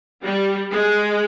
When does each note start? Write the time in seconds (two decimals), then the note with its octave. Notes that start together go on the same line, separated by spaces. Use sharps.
0.23 G3
0.72 G#3